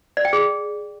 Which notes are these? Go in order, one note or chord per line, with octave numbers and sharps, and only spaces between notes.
D5
G5
G#4